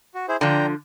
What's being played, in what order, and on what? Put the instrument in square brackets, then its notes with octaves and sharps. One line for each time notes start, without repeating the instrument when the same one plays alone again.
[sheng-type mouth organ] F#4
E4 G#4 C5
[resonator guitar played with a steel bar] D3 F3 [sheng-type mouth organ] D4 G5 A#5